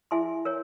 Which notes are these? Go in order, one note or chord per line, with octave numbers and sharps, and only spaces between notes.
E4 G#4 E5 G#5 C6
A#4 C#5